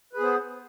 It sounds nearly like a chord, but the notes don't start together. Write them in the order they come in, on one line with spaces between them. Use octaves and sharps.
B4 G#4 B3 C5